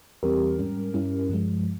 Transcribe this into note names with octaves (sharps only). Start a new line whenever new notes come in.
E2 E3 G3 C4 G4 A#4
G#2 G3 C#4
G2 G3 C#4 E4
G2 F3 G#3